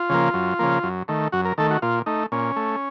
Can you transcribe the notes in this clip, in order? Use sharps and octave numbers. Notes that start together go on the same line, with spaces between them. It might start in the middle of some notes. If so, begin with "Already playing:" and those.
Already playing: F4
C#3 F3 A#3
F#2
C#3 F3 A#3
F#2
D#3 A3
F#2 F#4
A#4
D#3 A3 A4
F#4
A#2 F4
A3 D#4
A#2 C#4
A3